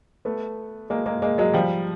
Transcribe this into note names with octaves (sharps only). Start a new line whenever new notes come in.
A3 B3
G#3 A#3
G#3 A#3
G#3 A#3
F#3 G#3
F3 G3